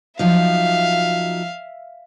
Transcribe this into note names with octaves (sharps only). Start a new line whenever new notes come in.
F3 F#3 D#4 E5 F5